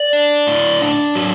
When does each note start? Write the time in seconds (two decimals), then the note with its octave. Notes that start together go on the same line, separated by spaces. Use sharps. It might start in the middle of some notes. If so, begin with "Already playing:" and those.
Already playing: D5
0.13 D4
0.47 A2
0.81 D4
1.15 F#3